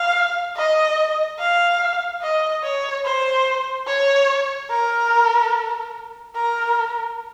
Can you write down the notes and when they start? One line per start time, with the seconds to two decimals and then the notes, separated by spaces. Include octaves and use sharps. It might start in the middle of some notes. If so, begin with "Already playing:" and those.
Already playing: F5
0.56 D#5
1.39 F5
2.22 D#5
2.64 C#5
3.05 C5
3.87 C#5
4.70 A#4
6.35 A#4